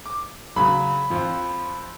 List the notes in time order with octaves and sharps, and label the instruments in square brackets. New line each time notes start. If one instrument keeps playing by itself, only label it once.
[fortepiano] D6
[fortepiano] C#3 F#3 [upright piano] B5
[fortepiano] F2 F3